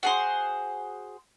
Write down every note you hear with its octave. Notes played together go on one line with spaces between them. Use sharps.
F#4 G#4 C5